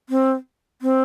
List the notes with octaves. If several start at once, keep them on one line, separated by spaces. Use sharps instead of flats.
C4
C4